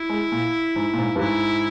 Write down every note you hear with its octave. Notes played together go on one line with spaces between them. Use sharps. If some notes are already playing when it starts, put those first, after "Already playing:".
Already playing: E4
G#3
A#2
G#2
A#2
G#2
G2
G#2 E4